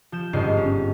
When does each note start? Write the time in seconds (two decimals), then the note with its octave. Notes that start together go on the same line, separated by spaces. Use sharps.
0.12 F3 G6 E7
0.33 G1 G#2 C#3 D#5 C7
0.57 C#4